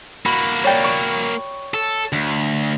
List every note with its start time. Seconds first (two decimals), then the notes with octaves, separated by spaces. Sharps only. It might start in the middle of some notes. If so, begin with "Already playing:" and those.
0.26 A#3 F#4 B5
0.64 C#5 D5 G5
0.84 C#6
1.74 A4
2.13 D2